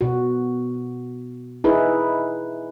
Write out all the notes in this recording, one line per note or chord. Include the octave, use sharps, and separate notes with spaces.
B2 F#4
D#4 E4 G#4 B4